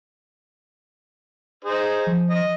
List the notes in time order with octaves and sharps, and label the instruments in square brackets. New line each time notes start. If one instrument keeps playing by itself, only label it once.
[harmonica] D#4 G#4 C5
[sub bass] F3
[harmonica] D#5